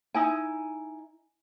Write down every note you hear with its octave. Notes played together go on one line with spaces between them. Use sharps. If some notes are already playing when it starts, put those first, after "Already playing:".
D#4 E4 G#5